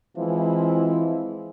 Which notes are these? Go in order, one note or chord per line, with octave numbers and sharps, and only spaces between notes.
E3 F3 G#3 C4 E4